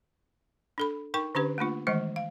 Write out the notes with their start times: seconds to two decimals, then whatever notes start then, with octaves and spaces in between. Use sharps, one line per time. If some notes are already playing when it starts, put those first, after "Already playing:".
0.78 D4 A4 B5
1.14 D#4 A#4 G5 C#6
1.35 D3 C#4 D4 G4 B4
1.58 A3 A#3 D4 F4
1.87 D#3 E3 G#3 A3 D#5
2.16 F5